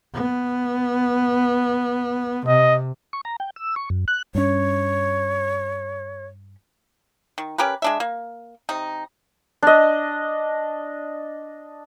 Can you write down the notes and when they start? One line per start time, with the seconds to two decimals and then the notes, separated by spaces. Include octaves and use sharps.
0.14 B3
2.47 C3 D#5
3.13 C#6
3.25 A#5
3.40 G5
3.56 E6
3.76 C#6
3.90 F#2
4.08 F#6
4.35 G2 C#4 C#5
7.38 D#3
7.58 C#4 G4 A#4 B4
7.82 G#3 D4 E5
8.00 A#3
8.69 C3 D#4
9.62 D4 D#5